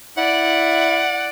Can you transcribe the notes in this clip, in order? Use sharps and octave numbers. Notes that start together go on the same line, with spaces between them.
E4 D5 F#5